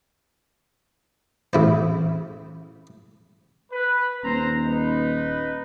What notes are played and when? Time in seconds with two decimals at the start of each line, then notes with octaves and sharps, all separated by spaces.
1.53 A1 E4 C5
3.72 B4
4.24 D#1 C4 C5 A#5
4.66 D#4 B4